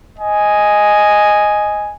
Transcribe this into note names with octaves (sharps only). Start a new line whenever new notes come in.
D#5 G#5